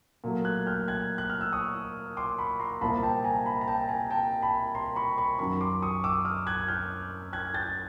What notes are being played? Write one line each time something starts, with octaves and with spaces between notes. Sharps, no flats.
A#2 F#3 A3
F#6 G#6
F6 G6
F#6 G#6
F#6
F6
E6
C#6 D#6
C6 D6
B5 C#6
A#5 C6
C2 A#2 F3 A5 B5
G5 A5
G#5 A#5
A5 B5
A#5
G5 A5
G#5 A#5
G5 A5
A5 B5
A#5 C6
B5 C#6
B5 C#6
F#2 D#3 F#3 B5 C#6
C6 D6
C#6 D#6
D6 E6
D#6 F6
F#6 G#6
F6 G6
F#6 G#6
G6 A6